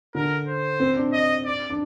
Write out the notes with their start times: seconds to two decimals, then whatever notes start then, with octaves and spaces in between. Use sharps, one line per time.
0.15 D3 A#4
0.47 C5
0.80 C4
0.96 D4
1.13 D#5
1.45 D5
1.70 D4